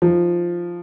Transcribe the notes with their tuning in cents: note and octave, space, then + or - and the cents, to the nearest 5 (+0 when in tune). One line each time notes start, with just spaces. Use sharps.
F3 +0 D#4 +0